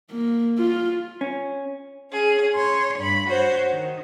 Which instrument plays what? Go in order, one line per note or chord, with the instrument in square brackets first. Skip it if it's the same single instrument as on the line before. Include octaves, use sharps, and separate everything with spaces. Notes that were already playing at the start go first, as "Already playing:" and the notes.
[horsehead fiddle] A#3
F4
[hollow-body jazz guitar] C#4
[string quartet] C#4 G#4
C#5 C6
G2 B5
F#4 C5 C#5
D#3